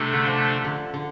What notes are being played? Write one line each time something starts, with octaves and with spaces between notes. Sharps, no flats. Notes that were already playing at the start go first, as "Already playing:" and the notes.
Already playing: C3 G3 A3 D4 A4
D3
F3
D3
D3